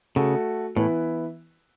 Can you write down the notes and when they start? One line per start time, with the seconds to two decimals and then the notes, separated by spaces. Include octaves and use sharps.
0.16 C#3 A3 F#4 A4
0.76 A2 E3 B3 E4 B4